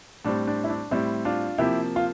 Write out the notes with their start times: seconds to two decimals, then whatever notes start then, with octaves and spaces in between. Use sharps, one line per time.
0.25 A2 G3 C4 D4
0.47 D4
0.64 E4
0.70 D4
0.91 A2 G3 C4 E4
1.25 D4 F4
1.58 C3 F3 A#3 E4 G4
1.96 F4